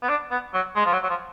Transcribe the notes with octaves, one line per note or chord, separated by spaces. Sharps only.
B3
D4
B3
F#3
G#3
F3
F#3
F#3
F3